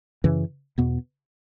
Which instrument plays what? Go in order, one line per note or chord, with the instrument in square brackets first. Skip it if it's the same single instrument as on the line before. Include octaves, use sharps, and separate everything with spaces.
[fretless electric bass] F#2 C#3 E3
E2 B2 B3